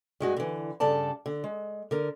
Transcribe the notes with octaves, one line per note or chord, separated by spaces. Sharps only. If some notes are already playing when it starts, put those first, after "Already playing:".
G2 G#3 F#4
D3 E3
G2 C#3 A4 D5 A5
D3
G#3
D3 A#4